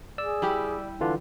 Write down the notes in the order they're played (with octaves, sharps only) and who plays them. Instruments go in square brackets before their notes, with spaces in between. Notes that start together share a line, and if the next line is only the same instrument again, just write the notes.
[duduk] G#4 [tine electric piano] D5 E6
[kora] G3 E4 G4
[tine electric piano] D3 E3 F4 [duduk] D4